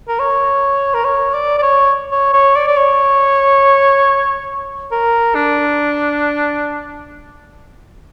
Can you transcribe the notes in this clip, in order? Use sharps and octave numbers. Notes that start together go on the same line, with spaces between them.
A#4
C#5
A#4
C#5
D5
D5
C#5
C#5
C#5
D5
D5
C#5
A#4
D4